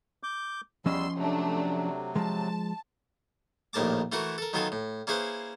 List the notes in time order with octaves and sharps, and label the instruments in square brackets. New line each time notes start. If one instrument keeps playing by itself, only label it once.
[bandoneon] D6 G6
[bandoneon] E2 G3 E6 [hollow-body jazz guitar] F3 C#4 D#5 [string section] C6
[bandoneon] C3 F#3 [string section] A3 D4
[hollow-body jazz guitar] F3 G#3 [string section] A5
[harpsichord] A#1 D#2 A2 A#4 A5 D6
E3 A3 E4 F#4 A#4
A4 A#4
D#3 F#3 B3 F4 A4 G#5
A2
A#3 C#4 E4 G#4 B4 C5